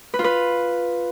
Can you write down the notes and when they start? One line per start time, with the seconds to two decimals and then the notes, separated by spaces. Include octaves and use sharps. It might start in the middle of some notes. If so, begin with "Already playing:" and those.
0.14 B4
0.19 F4
0.24 B4